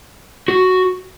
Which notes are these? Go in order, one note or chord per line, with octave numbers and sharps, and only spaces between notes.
F#4